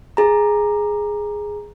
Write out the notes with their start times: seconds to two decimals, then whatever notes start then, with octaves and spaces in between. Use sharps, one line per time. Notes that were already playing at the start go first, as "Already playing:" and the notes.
0.17 G#4 A#5